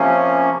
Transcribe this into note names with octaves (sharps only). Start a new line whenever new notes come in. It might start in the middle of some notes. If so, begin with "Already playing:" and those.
Already playing: C3 F3 A#3 C#4